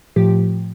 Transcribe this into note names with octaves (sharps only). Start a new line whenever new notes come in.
A2 F3 G4